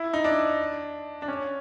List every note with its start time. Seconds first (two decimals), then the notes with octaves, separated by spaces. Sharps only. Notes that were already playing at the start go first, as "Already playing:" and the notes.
Already playing: E4
0.13 D#4
0.24 D4
1.22 D4
1.28 C#4